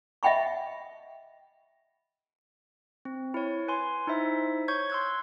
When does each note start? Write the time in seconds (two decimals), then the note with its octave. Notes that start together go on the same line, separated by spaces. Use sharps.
0.23 D#5 E5 F#5 G5 B5 C#6
3.05 C4
3.34 E4 C#5
3.68 B4 G#5 C6
4.07 D#4 E4 C5 E5
4.68 C#5 C#6 G6 G#6
4.90 C6 C#6 E6 F#6 G#6